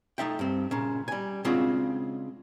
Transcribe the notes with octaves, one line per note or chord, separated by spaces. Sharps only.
A3 D#4 E5 G5
G2 C4
A#2 C#3
G3 G#5
C#3 G#3 C4 D4 F4 F#4